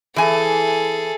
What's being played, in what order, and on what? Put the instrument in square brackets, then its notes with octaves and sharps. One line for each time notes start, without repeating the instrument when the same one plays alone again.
[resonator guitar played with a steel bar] E3 G#5 [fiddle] G#4 A4